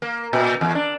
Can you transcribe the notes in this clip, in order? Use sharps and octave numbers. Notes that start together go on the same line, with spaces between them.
A#3
A#2
E2
D4